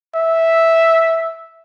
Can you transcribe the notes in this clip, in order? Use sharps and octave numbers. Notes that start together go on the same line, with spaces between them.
E5